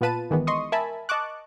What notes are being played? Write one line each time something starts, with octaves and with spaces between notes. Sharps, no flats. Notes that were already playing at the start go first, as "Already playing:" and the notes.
A#2 B3 F4 B4 A5 D#7
G#1 D#3 E3 G#3 B3
D#5 C6 C#6 D#6
A#4 E5 G#5 A5 B5
D#5 A5 C#6 D6 F#6